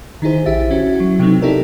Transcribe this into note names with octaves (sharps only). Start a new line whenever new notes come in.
D#3 D#4 E4 G#4 C5
A#1 E4 G4 E5 A6
C#4 E4 F#4
F#3
C3 F#3 A3 B3 C4 D#4
D#4 E4 G4 A4 A#4 D5